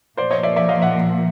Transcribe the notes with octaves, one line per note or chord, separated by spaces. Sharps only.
A#2 F3 A#3 C5 D5
C#5 D#5
D5 E5
D5 E5
D#5 F5
E5 F#5